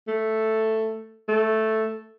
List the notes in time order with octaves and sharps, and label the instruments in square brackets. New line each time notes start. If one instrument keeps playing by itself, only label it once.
[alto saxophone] A3
A3